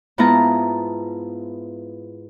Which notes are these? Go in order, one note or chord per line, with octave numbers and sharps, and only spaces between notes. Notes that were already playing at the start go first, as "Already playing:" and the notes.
G#2 B3 E4 F4 A5 A#5